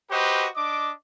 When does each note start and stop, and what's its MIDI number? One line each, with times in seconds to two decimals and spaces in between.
0.11 0.47 66
0.11 0.47 67
0.11 0.47 71
0.11 0.47 72
0.11 0.47 75
0.56 0.92 62
0.56 0.92 75
0.56 0.92 86